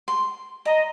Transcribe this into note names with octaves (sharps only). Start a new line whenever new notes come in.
C6
D#5 A#5